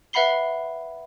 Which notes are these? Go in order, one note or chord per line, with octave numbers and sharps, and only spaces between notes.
B4 E5 F#5 B5 C7 G7